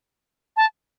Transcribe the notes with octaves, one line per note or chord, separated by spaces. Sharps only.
A5